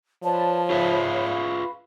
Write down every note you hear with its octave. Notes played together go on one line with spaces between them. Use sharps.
F3 B4 C#5 D5 A5
F4 G#4 B4 E5 F5 B5